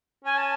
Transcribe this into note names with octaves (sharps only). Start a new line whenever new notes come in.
C#4 G#5
A5